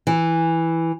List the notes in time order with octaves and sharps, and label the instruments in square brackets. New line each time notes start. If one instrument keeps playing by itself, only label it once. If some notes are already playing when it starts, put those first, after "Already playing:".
[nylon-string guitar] E3